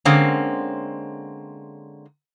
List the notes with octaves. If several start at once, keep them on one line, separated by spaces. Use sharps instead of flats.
D3 G#3 A#3 C4 C#4